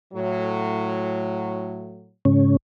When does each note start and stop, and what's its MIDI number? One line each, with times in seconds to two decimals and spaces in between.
0.13 2.14 45
0.13 2.14 54
2.25 2.57 44
2.25 2.57 49
2.25 2.57 61